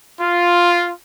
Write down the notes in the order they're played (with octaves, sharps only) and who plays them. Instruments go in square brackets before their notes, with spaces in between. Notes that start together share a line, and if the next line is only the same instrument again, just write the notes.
[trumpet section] F4